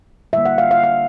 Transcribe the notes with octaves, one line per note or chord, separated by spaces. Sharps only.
D3 G3 A#3 E5
F#5
F5
F5
F5